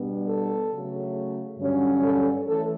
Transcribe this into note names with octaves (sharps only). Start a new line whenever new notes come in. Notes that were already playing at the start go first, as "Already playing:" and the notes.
Already playing: B2 G3 B3 D4
A4
C#3 F#3 A3
G2 D3 F#3 C#4
A4
E3 A3 A4